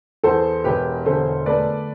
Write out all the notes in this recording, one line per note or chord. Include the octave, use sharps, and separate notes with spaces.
E2 A4 C5
E1 G4 B4
D3 A4 C5
A3 B4 D5